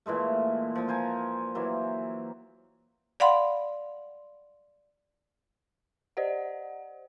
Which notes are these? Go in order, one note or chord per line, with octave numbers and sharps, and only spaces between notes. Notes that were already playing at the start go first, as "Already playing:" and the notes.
A#2 E3 G#3 A3
A#2 F3
A#4 C5 G#5 A#5
E3 F#3 A#3
D5 F5 F#5 B5 C6
G4 C5 D5 D#5 F#5